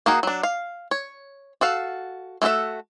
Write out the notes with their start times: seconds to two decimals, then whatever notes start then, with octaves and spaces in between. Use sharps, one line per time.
0.06 D#3 A#3 D#4 F#4 G#4
0.23 F#3 D4
0.43 F5
0.91 C#5
1.61 F#4 A4 F5
2.42 A3 E4 F#4 A4 E5